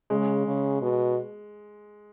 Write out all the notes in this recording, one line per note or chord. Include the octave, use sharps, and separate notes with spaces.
C#3 G#3
C#3
B2